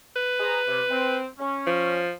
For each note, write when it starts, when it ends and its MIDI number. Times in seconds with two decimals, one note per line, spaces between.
0.16 1.17 71
0.40 0.60 68
0.40 0.60 72
0.40 0.60 82
0.68 0.81 48
0.90 1.26 60
1.39 2.00 61
1.67 2.12 53